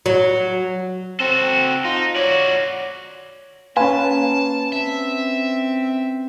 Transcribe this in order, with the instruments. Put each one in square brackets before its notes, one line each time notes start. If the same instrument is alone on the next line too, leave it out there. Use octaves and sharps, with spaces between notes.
[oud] F#3
[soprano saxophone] C4 [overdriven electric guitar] F#4 A4
[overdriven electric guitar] D#4 [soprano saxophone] F4
[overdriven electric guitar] F#4 D5 [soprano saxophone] C#5
[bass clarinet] A#3 [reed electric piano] C#4 B4 [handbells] F5 G#5 C6 [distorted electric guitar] A5
[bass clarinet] C4 [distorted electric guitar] E5